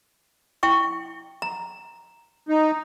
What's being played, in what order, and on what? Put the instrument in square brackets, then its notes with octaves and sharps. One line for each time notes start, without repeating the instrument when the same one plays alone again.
[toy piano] E4 G5 C#6
A#5
[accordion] D#4